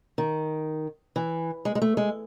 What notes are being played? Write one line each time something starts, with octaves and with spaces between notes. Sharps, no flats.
D#3
E3
G#3
G#3
A3
G#3